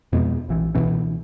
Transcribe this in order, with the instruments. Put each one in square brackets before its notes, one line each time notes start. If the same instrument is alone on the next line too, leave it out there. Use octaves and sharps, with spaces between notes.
[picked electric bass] F2 B2 G#3 B3
A#1 E3
C#2 B2 E3 C#4